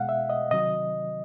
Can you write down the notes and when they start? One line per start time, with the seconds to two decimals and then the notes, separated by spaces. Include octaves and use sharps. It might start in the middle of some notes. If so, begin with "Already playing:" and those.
Already playing: B2 G#3 F5 F#5
0.09 E5
0.30 D#5
0.51 C3 D#3 F#3 D#5